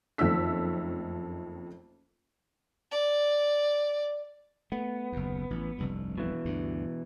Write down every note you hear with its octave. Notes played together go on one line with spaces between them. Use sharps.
F#1 F2 D#3 A3 E6 B6
D5
A3 B3
F#1 D#2
A1
F1 C2 G2
B2 E3
D2 G2